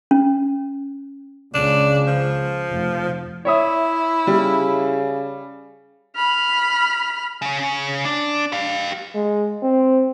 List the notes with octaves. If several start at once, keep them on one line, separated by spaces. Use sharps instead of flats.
C#4
C#2 C#3 D4
F3
F1
E4 C#5 E5 D#6
C#3 G3
B5 F6
C#3 C#4
D4
G4 F5
G#3
C4